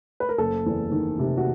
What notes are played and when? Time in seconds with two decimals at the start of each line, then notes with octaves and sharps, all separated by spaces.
0.20 B4
0.29 A#4
0.38 F#1 A4
0.66 E2
0.92 D#3
1.19 C3
1.37 F#4